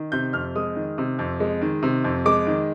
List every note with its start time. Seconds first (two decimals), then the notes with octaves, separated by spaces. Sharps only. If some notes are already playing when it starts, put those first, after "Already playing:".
Already playing: D#3
0.12 C3 G6
0.33 F2 F6
0.55 G#3 D#6
0.76 D#3
0.98 C3
1.19 F2
1.40 G#3
1.61 D#3
1.83 C3
2.04 F2
2.25 G#3 D6
2.47 D#3